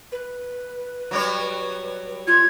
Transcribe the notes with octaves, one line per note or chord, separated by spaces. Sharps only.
B4
F#3 G3 C#5
F4 G#6